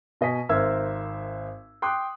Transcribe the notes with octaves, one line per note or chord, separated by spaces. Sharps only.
B2 D#5 G#5 B6
G#1 A#4 C5 E5 E6 G#6
G5 C6 D6 D#6 F#6